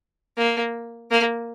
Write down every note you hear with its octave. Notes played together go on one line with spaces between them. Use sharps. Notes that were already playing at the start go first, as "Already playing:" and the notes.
A#3
A#3